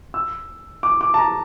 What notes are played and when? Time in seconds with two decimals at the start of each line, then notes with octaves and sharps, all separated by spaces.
0.14 E6
0.83 D6
1.01 D6
1.14 A5
1.18 A#5